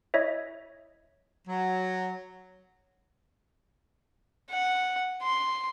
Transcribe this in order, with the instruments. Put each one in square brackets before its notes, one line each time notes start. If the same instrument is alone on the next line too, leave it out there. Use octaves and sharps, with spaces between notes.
[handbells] E4 C#5 D#5 E5
[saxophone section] F#3
[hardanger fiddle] F#5
C6